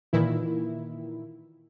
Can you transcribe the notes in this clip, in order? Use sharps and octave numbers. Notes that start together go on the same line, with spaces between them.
A#2 D#3 E3 E4